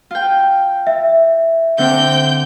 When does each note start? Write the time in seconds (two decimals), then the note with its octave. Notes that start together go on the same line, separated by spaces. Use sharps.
0.11 F4 G5
0.87 E5
1.78 D3 C4 D4 G5 G6